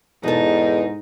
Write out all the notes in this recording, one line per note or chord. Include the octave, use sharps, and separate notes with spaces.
E2 G#2 B2 D#4 A4